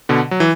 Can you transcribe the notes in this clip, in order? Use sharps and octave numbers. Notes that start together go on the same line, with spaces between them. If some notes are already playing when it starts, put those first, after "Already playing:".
B2 D3
F#3
E3